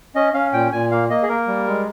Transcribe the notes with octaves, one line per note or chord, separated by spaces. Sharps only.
C#4 D#5
C#4 F5
A#2 G5
A#2 G#5
A#3 F5
A#3 D#5
G#4
A#3 A#4
G3
G#3